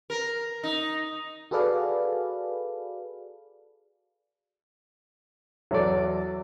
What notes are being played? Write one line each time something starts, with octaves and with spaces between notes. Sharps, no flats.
A#4
D#4
F#4 G#4 A4 B4 D5 F5
E2 F#3 A4 D5